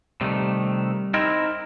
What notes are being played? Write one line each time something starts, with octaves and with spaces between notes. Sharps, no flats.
C3 D#3 G3 A3
C4 D#4 E4 A#4